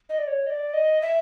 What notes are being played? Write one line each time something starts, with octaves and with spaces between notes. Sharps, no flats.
D#5
D5
C#5
D#5
D5
D#5
E5